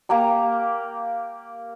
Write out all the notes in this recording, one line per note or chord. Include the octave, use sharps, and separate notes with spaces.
A#3 G4 A#5 D6